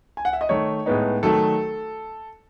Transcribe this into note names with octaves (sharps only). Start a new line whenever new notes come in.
G#5
F#5
E5
D#5
D#3 A3 D#4 C#5
A2 G#3 B3 D#4
D#3 F#3 A3 A4